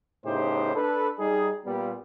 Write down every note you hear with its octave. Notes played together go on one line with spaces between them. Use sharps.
A2 C#3 B3 D#4 G4 C5
D4 A4 B4
G3 D#4 G#4
A#2 G3 B3